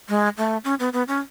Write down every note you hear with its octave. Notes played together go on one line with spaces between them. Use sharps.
G#3
A3
C#4
B3
B3
C#4